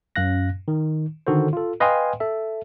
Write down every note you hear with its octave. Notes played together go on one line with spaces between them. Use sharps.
F#2 C#4 F5 F#6 A#6
D#3
D3 D#3 F#4 A4 C5
F4 A4
B4 D#5 F5 G5 G#5 C6
A4 E5